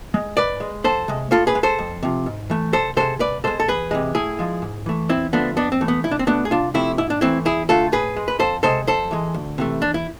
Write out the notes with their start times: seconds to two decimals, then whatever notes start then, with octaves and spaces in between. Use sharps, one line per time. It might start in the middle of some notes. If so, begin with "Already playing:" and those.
0.14 G#3
0.37 G#2 B4 D5
0.60 G#3
0.84 F2 A4 C5
1.08 C3 G#3
1.31 A2 F4 A4
1.47 G#4 B4
1.55 G#3
1.63 A4 C5
1.79 F2
2.03 C3 F3
2.26 G#2
2.50 E3 A3
2.73 C2 A4 C5
2.97 C3 G#3 A4 C5
3.20 C2 B4 D5
3.44 B2 G#3 A4 C5
3.60 A4
3.68 E2 G#4 B4
3.91 C3 E3 G#3
4.15 A2 E4 G#4
4.39 F3 G#3
4.62 G#2
4.86 E3 A3
5.09 E2 C4 E4
5.33 D3 F3 A3 B3 D4
5.56 F2 B3 D4
5.72 C4
5.81 E3 A3
5.88 B3
6.04 C2 E4
6.11 D4
6.19 C4
6.27 B2 A3 B3 D4
6.45 G#4
6.51 C2 D4 F4
6.74 C3 F3 A3 C4 E4
6.98 G#2 E4
7.10 D4
7.21 E3 A3 C4 E4
7.45 E2 E4 G#4
7.69 D3 A3 F4 A4
7.92 A2 G#4 B4
8.16 G#3
8.28 B4
8.40 F2 A4 C5
8.63 C3 G#3 A4 C5
8.87 F2 A4 C5
9.11 E3 G#3
9.34 D2
9.58 C3 E3 A3
9.81 E2 D4
9.94 E4